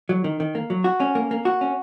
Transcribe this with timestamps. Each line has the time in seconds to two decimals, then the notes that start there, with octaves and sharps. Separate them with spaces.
0.09 F#3
0.24 D#3
0.40 D#3
0.55 A#3
0.70 F#3
0.84 F#4
1.00 C#4
1.15 A#3
1.31 A#3
1.45 F#4
1.61 C#4